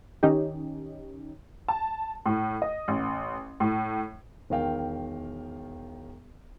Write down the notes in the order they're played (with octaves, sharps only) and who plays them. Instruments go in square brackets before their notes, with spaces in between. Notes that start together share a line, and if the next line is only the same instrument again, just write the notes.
[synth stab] D#3 C#4 D#4 G4
[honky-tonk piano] A5
A2
D#5
A1
A2
[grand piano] E1 D#3 F5 G5